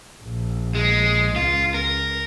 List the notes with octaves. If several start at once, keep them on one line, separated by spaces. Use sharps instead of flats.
A#1
G#3
C#2 F4
A#4